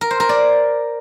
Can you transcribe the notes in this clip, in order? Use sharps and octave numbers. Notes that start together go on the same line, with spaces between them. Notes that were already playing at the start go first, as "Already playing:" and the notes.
A#4
C5
A#4
D5